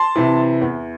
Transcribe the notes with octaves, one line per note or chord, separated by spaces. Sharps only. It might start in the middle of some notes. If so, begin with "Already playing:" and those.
Already playing: A5 C6
C3 E3
E2